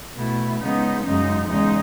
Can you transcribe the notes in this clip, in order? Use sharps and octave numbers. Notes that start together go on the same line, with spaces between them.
B2 A3 E4
C#3 G#3 B3 D#4
F#2 C#3 G#3 D#4
E2 C#3 G#3 D#4